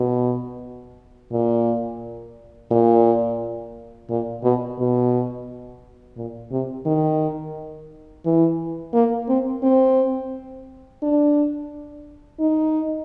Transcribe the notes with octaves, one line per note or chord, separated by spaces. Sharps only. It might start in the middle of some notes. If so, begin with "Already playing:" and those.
Already playing: B2
A#2
A#2
A#2
B2
B2
A#2
C3
D#3
E3
A#3
C4
C4
D4
D#4